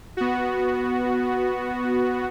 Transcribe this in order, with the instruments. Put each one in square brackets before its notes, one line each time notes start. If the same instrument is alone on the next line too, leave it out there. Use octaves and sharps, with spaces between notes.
[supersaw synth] B3 F#4